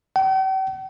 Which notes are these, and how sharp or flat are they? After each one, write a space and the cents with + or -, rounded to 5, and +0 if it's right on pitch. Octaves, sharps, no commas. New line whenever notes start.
G5 -45